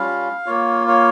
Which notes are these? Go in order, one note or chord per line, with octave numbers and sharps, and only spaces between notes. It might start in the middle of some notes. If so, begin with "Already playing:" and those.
Already playing: G3 C#4 F4 F5
A#3 F4 C#5
C#5